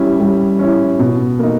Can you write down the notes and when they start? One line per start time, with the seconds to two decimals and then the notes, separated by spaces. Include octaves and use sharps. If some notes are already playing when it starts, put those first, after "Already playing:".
Already playing: G3 C#4 E4
0.20 G3
0.59 C#4 E4
0.99 B2
1.39 A#3 D#4